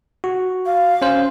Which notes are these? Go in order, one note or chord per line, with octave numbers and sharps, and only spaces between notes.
F#4
F5
C#4 C5